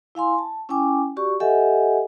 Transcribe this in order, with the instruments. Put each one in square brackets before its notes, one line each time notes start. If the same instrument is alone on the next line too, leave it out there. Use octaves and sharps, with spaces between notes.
[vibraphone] E4 F5 G#5 C6
A5
C#4 E4 G5 G#5 D6
F#4 G4 D5 C#6
G4 A4 D#5 E5 F#5 G#5